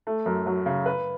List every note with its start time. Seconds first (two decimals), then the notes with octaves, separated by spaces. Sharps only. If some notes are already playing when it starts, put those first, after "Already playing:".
0.07 A3
0.26 F#2
0.46 F#3
0.66 C#3
0.86 B4